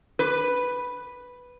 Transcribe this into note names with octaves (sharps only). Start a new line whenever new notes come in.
B4